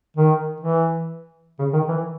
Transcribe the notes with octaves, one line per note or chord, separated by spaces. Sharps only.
D#3
E3
C#3
D#3
E3